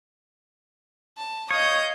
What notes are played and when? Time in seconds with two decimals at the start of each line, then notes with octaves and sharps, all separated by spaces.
1.17 A5
1.51 C#5 D#5 F5 D#6 G6